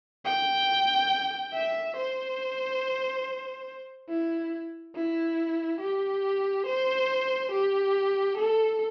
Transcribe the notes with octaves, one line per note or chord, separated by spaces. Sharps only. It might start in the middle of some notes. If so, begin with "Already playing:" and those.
G5
E5
C5
E4
E4
G4
C5
G4
A4